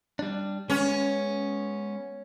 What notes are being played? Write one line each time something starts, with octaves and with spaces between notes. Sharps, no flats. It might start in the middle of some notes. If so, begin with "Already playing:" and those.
G3 D4
G#3 B3 C#4 C#5